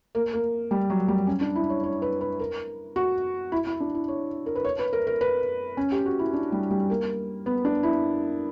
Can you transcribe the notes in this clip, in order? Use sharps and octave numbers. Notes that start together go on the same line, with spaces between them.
A#3
A#3
G3
F#3
G3
C#4
D4
E4
C#5
C#5
B4
B4
A#4
F#4
E4
E4
D4
E4
C#5
A#4
B4
C#5
B4
A#4
A#4
B4
C#4
G4
F#4
E4
D4
G3
G3
A#3
B3
D4
E4